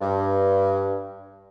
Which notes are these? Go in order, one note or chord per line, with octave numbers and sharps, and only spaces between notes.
G2